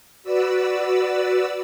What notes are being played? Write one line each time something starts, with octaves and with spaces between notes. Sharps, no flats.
F#4 B4 D5 E6